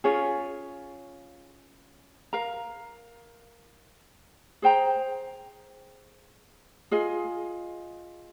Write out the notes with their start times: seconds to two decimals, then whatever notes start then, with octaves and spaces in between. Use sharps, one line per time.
0.04 C#4 F4 G#4 C#5
2.33 A#4 F5 A#5
4.62 G#4 C5 G5 A#5
6.91 F4 G#4 D#5 G#5